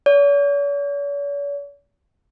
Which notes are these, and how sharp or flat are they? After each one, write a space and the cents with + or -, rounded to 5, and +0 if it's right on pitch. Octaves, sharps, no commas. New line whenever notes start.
C#5 +45